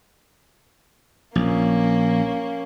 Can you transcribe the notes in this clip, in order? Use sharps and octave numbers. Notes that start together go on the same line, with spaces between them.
A#1 A#3 C#4